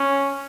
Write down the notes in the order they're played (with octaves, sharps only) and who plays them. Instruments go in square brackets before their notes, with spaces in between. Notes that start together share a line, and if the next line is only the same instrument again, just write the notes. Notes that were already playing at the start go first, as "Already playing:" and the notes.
Already playing: [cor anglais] C#4